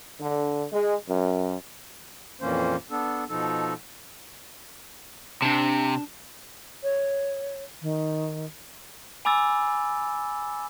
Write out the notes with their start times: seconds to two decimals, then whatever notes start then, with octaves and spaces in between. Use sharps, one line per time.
0.20 D3
0.72 G#3
1.08 F#2
2.41 F2 A#2 E3 A#3 C#4 C5
2.91 B3 D4 A4
3.29 B2 F3 D#4 A4
5.42 C3 D4 A5
6.83 C#5
7.82 D#3
9.25 G#5 B5 D6 E6 A6